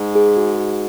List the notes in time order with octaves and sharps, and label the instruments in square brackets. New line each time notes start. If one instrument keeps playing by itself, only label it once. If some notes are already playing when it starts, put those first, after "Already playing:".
Already playing: [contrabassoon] G#2
[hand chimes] G#4
F#4
F#4